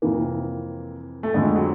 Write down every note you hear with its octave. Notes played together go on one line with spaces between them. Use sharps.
F2 C3 E3 A#3
A3
F2 D3 G#3
F#3